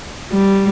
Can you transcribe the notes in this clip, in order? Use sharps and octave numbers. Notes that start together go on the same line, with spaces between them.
G3